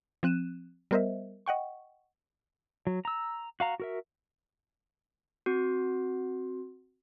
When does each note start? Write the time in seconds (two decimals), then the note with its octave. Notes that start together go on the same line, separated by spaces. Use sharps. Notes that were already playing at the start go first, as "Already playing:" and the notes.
0.23 F3 C4 F#6 D#7 E7
0.91 G3 B3 A#4 C5 D#5 E5
1.46 D#5 F#5 G5 C#6
2.87 F#3
3.05 A#5 E6
3.60 F#4 F5 A#5
3.80 F#4 A#4 E5
5.46 C4 F#4